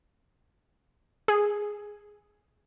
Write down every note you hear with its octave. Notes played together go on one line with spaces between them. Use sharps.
G#4